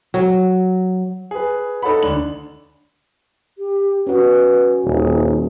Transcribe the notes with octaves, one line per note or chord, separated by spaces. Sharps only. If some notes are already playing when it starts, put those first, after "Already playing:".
F#3
G#4 B4
D#4 A4 C#5 F#5 B5
D2 D4 F#7
G4
C#4 F#4 B4
D#1 D#4